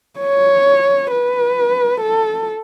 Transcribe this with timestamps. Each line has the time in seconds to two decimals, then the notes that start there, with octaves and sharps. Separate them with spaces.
0.20 C#5
1.10 B4
2.00 A4